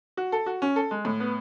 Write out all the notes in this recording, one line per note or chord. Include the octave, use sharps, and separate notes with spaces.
F#4
A4
F#4
C#4
A4
G#3
A2
B3